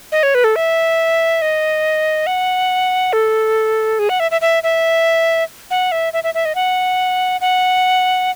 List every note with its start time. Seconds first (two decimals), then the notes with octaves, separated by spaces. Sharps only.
0.12 D#5
0.23 C#5
0.35 B4
0.44 A4
0.56 E5
1.42 D#5
2.27 F#5
3.13 A4
3.99 G#4
4.09 F#5
4.20 E5
4.31 E5
4.41 E5
4.63 E5
5.71 F#5
5.92 E5
6.13 E5
6.24 E5
6.34 E5
6.45 D#5
6.55 F#5
7.41 F#5